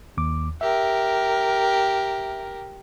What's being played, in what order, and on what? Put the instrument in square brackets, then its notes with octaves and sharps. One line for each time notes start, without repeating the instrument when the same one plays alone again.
[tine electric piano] D#2 D6
[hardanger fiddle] G4 A#4 [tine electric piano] E5